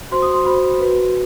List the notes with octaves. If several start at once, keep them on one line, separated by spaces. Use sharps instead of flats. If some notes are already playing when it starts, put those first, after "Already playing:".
F#4 C5 C6
D#6
C6
F#4 C5 B5
F#4 B4